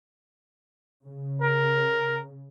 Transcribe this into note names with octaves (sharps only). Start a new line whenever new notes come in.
C#3
A#4